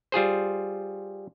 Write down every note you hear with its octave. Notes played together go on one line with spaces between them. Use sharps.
G3 F4 G#4 C5